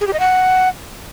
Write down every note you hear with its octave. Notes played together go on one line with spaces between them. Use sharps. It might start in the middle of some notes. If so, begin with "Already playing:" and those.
G#4
G4
D#5
F#5